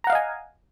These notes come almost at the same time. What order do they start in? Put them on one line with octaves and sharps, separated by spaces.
A#5 F#5 F5 D#5 G#5